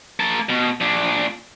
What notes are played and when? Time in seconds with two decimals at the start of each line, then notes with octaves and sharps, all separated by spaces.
0.20 A#3 A5
0.49 B2
0.81 A#2 D4